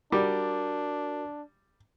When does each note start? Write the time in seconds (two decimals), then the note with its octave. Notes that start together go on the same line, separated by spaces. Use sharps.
0.12 G3 D4 F#4 A#4 D6